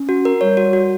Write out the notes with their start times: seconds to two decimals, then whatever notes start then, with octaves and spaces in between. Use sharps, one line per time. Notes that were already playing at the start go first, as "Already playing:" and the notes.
Already playing: C#4
0.09 F#4
0.25 A#4
0.41 G3 C#5
0.57 F#4
0.73 F#4